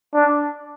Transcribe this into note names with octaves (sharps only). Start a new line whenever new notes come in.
D4